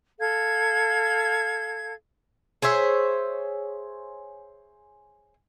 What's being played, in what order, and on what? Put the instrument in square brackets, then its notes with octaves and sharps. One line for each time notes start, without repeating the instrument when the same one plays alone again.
[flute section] A4 F5 G#6
[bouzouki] G#4 C5 C#5 E5